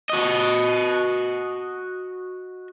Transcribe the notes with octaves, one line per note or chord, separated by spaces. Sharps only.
F#4 D#5